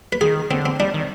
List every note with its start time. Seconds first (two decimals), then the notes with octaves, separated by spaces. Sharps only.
0.13 B4
0.21 D#3 G#4
0.50 D3 C4
0.66 C4
0.80 G3 D4
0.94 D#3